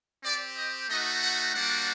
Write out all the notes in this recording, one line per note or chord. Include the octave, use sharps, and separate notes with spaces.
C4 G4 D5
D#5
A3 D#4 F#4 D#5
F#5
G3 A#3 D4 F#4 F#5